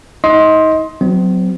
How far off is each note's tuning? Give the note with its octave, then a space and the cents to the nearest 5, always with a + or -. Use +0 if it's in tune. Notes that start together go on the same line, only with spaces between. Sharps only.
D#4 +30 D#5 +25 C6 +10
F#3 +0 C4 -40